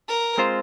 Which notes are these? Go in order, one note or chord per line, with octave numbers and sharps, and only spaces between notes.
A#4
G#3 C4 F4 C5